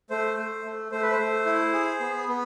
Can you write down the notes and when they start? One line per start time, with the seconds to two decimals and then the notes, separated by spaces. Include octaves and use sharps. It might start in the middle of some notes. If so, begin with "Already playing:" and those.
0.10 A3 C5
0.37 A3
0.65 A3
0.92 A3 C5
1.02 B4
1.12 C5
1.19 A3
1.46 E4
1.73 G#4
2.00 B3
2.28 B3